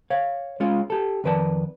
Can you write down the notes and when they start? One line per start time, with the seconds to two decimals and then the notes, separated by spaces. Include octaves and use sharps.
0.10 C#5 F5
0.60 G#3 C#4 F4
0.90 G4 A4
1.24 F2 D#3 B4 D5 A5